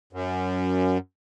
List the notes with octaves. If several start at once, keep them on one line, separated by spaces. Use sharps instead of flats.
F#2